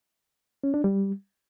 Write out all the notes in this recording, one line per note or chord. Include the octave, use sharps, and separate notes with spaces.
C#4
D4
G3